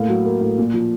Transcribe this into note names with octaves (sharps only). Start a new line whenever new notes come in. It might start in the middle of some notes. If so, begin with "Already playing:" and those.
Already playing: A2 A#3 F5
F#3
A#3
A2
A#2
F3